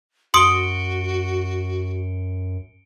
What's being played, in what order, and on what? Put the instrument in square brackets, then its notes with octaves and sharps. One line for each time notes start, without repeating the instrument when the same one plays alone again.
[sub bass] F#2 [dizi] F#4 [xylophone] C6 D#6 [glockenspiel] C#7 D7 G7